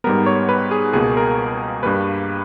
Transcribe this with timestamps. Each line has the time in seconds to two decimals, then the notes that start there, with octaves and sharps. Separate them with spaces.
0.04 G#2 G3 B3 A#4
0.26 C#5
0.49 B4
0.71 G#4
0.93 C#2 B2 A#3 G#4
1.17 A#4
1.83 G2 G3 A#3 B4